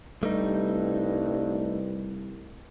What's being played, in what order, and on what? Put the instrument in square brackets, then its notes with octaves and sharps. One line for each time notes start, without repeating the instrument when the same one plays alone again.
[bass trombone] C2 [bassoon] G2 [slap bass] G3 [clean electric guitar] A3 D#4